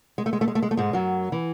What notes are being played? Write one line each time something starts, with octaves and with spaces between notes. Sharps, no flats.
G#3
A3
G#3
A3
G#3
A3
G#3
A3
G#2 G#3
F#2 F#3
E3